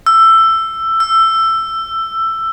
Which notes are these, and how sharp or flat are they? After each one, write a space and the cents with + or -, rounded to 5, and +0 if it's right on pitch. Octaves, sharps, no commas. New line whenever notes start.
E6 +15
E6 +20